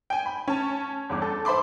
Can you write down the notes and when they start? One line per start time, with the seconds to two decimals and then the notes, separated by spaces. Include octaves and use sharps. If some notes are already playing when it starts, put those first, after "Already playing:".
0.10 G5 G#5
0.26 B5
0.48 C#4 A5
1.09 G1 E2 D6
1.22 A4
1.45 C5 E5 B5 C6 D6